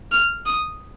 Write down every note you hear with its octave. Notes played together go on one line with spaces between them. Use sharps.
F6
D#6